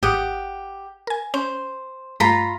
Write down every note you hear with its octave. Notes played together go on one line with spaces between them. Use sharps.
G#1 G4 F#5 D#6
A#4 G#5
C#4 C5
G2 A3 F4 A#5 B5